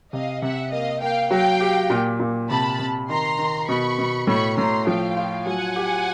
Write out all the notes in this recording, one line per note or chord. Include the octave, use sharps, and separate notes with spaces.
C3 D#5 F5
C3 E5 F#5
A#3 D#5 F5
A#3 F5 G5
F#3 F5 G5
G4
A#2
A#2
C3 A5 B5
C3
D#3 A#5 C6
D#3
B2 B5 C#6
B2
A2 B5 C#6
A2 A#5 C6
F3 F5 G5
F4
F#3 F#5 G#5
G4